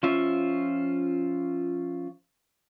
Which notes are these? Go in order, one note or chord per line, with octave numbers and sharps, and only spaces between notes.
F3 C#4 F4 E5